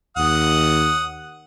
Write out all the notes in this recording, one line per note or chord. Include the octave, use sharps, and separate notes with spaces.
D#2 F#5 D#6